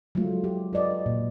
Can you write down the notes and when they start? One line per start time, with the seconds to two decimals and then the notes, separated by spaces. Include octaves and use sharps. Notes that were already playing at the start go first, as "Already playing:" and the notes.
0.15 F#3 G#3 A3 F4
0.44 G4
0.73 F4 B4 D5 D#5
1.06 A#2